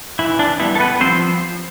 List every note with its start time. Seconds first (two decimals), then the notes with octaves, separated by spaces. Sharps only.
0.19 E3 E4
0.39 D4
0.60 G3 B3 E4
0.75 A4
0.80 B3 B4
1.01 F3 C4 C5